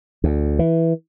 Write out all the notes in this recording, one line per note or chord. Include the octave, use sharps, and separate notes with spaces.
D2
E3